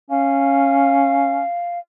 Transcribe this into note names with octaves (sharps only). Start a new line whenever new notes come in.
C#4 F5